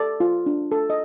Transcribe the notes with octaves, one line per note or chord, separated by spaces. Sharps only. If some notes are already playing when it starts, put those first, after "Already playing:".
Already playing: A4 D5
F4
D4
A4
D#5